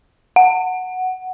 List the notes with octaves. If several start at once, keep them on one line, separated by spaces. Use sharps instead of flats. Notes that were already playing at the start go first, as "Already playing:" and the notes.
F#5